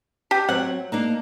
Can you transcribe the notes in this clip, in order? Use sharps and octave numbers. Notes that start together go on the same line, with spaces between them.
G4
F#3 C4 F#5
A#3 D4 D#4